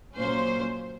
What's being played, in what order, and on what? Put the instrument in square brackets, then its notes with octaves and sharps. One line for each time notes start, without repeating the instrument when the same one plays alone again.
[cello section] A#2 F#3 A#3 C#4 C5